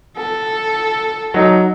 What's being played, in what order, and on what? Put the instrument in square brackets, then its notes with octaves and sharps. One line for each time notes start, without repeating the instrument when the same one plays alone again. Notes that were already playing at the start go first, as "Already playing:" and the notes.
[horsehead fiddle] A4
[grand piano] F#3 D#4